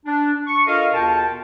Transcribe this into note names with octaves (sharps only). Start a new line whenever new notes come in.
D4
C#6
F4 A4 A#4 D#5 F5
E2 B2 F4 A#4 G5 A5